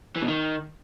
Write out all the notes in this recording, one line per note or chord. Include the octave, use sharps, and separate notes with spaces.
E3
B2
D#3